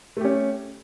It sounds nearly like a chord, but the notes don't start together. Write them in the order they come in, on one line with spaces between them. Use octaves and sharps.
A3 G4 C#4